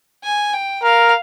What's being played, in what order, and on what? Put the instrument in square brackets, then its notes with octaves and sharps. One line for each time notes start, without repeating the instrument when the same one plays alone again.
[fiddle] G#5
G5
[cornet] A#4 [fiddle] F5